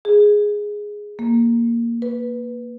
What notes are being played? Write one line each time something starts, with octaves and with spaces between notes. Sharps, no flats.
G#4
A#3
B4